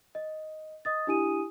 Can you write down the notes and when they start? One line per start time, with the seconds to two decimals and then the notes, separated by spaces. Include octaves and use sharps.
0.15 D#5
0.85 D#5 D#6 A6
1.07 D4 E4 G4 G#5 D#6 D#7